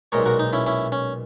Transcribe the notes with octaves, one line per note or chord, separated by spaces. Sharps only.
B1 A#2 G#3 A#4 C#5
F#4 A#4
D#4
C#4 E4
C#4 E4
C#4